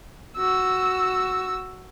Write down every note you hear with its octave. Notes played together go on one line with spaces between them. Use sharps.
F#4 E6